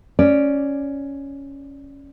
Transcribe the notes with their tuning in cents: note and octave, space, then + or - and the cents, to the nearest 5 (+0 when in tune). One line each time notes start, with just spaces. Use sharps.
C#4 +0 D5 +0